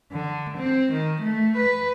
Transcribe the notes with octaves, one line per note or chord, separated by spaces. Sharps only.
D3
C4
D#3
A3
B4